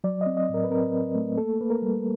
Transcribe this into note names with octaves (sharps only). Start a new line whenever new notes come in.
F#3 D5
D#5
C4
D#5
A2 A#4
B4
C4 A#4
C4
A3
A#3 A4
A#3 B4
A#4
G3